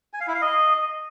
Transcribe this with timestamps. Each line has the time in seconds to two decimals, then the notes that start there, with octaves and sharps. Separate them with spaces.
0.13 G#5
0.20 F5
0.27 E4
0.34 F5
0.42 D#5